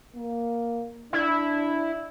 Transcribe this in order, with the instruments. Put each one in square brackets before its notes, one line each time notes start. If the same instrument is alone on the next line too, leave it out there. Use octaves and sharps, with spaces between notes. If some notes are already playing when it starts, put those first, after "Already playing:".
[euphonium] A#3
[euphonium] D4 [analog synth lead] E4